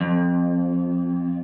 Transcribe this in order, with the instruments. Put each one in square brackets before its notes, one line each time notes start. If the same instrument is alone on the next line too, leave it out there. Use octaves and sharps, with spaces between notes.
[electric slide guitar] F2